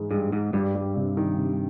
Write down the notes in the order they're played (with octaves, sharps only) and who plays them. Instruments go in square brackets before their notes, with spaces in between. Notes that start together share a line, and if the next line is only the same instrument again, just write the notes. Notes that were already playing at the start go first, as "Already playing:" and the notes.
Already playing: [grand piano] G#2 E3 G#3
[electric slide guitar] G2 [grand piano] G#3
[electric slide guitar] G#2 [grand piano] G#3
[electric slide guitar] G2 [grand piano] G3
[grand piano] G3
C3
D#3
C3